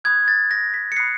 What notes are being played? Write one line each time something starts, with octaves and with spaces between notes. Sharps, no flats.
B5 D#6 F#6 G#6
A6
A#6
B6
C#7
B5 D#6 F#6 C7